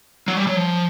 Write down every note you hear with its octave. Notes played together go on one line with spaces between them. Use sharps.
F#3
G3
F#3
F3